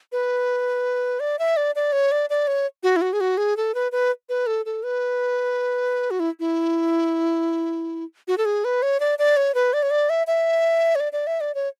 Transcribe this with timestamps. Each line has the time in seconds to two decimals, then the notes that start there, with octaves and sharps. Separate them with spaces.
0.12 B4
1.20 D5
1.39 E5
1.57 D5
1.75 D5
1.92 C#5
2.12 D5
2.30 D5
2.47 C#5
2.83 F#4
2.96 E4
3.02 F#4
3.13 G#4
3.21 F#4
3.37 G#4
3.57 A4
3.75 B4
3.92 B4
4.29 B4
4.47 A4
4.66 A4
4.83 B4
6.11 F#4
6.20 E4
6.40 E4
8.28 F#4
8.38 A4
8.45 G#4
8.65 B4
8.82 C#5
9.00 D5
9.19 D5
9.37 C#5
9.55 B4
9.73 D5
9.83 C#5
9.91 D5
10.10 E5
10.27 E5
10.95 C#5
11.00 D5
11.13 D5
11.27 E5
11.41 D5
11.55 C#5